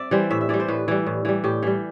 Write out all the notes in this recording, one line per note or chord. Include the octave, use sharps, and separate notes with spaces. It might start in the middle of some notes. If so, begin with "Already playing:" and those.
Already playing: C4 D5 E5
E3 G3 C5
A2 E5
E5
E3 G3 D5
C5
A2 B4
E3 G3
A2
E3 G3
A2 G4
E3 G3